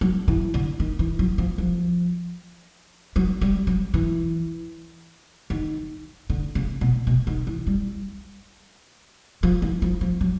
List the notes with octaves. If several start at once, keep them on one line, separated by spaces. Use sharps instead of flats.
F#3
E3
D3
D#3
E3
F#3
F3
F3
F#3
G3
F#3
E3
D#3
D3
C#3
B2
B2
D#3
E3
G3
F3
E3
F3
F3
F#3